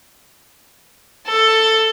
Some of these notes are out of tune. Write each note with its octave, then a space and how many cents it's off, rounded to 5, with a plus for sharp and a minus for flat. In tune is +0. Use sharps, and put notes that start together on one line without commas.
A4 +10